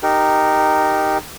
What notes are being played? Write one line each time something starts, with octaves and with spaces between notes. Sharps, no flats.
D#4 G4 A#4